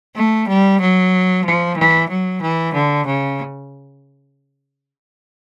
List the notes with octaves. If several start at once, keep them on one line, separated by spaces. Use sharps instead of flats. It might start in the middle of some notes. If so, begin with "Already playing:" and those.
A3
G3
F#3
F3
E3
F#3
E3
D3
C#3